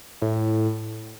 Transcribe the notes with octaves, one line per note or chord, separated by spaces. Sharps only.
A2